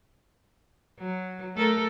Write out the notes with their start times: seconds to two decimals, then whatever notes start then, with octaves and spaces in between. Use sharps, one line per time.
0.98 F#3
1.55 A3 A4 A#4